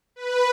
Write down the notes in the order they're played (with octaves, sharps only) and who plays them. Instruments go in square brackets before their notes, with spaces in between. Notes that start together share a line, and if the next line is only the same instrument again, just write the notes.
[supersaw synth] B4